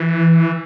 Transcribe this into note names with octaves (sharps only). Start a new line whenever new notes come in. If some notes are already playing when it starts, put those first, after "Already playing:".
Already playing: E3